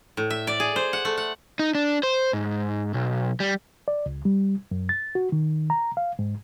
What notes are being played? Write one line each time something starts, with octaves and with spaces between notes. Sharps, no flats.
A2
E5
D5
G#4
C5
F#5
A3
F#5
D#4
D4
C5
G#2
B1
G3
D5
C#2
G3
F#2
A6
F#4
D#3
A#5
F5
G#2